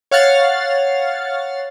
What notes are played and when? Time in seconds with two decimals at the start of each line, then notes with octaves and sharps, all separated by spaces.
0.11 C#5 F5 F#5 F6 A6